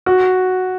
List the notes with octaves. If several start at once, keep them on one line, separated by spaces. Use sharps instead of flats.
F#4